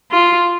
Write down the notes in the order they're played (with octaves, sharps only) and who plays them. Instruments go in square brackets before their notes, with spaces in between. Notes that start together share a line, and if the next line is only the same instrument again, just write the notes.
[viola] F4